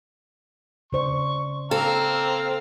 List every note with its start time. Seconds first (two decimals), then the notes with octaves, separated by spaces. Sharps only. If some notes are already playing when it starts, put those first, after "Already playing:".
0.93 C#3 C5 D5 C#6
1.71 C4 A4 F5 A#5